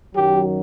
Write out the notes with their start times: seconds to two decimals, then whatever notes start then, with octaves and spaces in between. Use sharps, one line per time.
0.15 F#2 D#3 F#3 G4